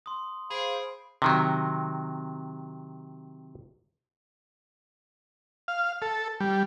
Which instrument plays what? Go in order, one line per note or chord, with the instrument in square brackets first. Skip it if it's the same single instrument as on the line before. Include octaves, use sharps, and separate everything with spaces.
[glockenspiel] C6 D#6
[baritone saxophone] G#4 [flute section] C5 F5 [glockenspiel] B5 C7 D7
[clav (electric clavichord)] C3 D#3 F#3
[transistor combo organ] F5
A4
G3